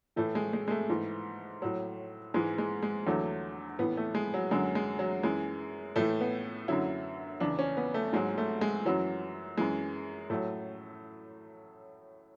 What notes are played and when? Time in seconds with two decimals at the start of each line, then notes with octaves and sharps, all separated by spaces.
0.16 A2 E3 A3
0.35 G#3
0.53 G#3
0.68 G#3
0.71 A3
0.90 G#2 E3
1.62 A2 F#3
2.34 G#2 E3 G#3
2.58 G#3
2.83 G#3
3.07 E2 D3 F#3 A3
3.79 A2 E3 B3
3.97 A3
4.15 G#3
4.34 F#3
4.51 F#2 D3 F#3 G#3
4.75 G#3
4.99 F#3
5.23 F#2 E3 G#3
5.96 A2 E3 A3
6.21 B3
6.68 F#2 D3 F#3 E4
7.40 E2 C#3 E3 D4
7.59 C#4
7.77 B3
7.94 A3
8.13 G#2 F#3 G#3
8.38 A3
8.61 G#3
8.85 F#2 E3 F#3
9.57 F#2 E3 G#3
10.30 A2 F#3 A3